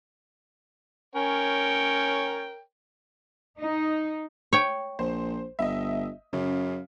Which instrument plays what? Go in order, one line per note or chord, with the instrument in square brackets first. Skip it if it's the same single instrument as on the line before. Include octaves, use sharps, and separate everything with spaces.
[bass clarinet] C#4 [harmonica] A#4 C#5 G5
[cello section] D#4
[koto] C#5 G5
[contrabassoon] A#1 [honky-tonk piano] C5
[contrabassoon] G1 [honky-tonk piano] D#5 E5
[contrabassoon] F#2 [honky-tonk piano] C#3